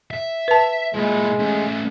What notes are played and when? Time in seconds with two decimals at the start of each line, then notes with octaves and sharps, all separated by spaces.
0.11 E5
0.48 B4 A5
0.94 A#2 G#3 E4
1.39 A3 C#4